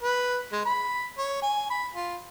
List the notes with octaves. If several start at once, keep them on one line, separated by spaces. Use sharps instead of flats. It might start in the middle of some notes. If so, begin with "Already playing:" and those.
B4
G#3
B5
C#5
G#5
B5
F4